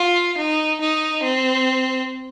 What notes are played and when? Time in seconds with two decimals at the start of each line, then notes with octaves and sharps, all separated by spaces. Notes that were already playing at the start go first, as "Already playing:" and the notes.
Already playing: F4
0.37 D#4
0.81 D#4
1.23 C4